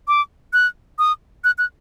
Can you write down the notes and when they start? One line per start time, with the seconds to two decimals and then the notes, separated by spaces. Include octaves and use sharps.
0.08 D6
0.53 F#6
0.99 D#6
1.44 F#6
1.58 F#6